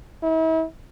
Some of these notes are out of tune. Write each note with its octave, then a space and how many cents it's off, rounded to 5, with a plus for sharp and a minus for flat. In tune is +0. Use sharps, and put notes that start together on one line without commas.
E4 -40